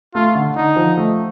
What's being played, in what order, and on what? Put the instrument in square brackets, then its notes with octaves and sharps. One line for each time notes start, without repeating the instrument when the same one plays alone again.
[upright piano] A3 [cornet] F4
[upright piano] D3
[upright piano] D3 [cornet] D#4
[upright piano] F3
A3